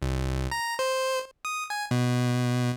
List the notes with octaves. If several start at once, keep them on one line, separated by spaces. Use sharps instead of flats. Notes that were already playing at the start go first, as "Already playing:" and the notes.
C2
A#5
C5
D#6
G#5
B2